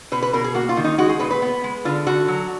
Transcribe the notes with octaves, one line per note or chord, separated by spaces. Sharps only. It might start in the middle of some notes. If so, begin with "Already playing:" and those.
B2 B4
B4
B2 A#4
G#4
A#3 F#4
F4
D#3
D#4
G#3 F#4
G#4
A#2 B4
B4
B3
G#3
D3 F4
D3 F#4
F#3